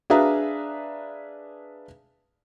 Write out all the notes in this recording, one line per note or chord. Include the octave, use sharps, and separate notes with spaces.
D4 G#4 B4 E5 F5 A#5